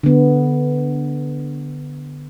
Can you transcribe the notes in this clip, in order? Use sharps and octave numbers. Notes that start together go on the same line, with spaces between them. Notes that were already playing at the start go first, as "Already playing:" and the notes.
D3 B3